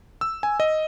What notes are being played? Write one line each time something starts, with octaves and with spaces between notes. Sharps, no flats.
E6
G#5
D#5